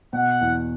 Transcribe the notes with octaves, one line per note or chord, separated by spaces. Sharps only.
B2 F#5
E2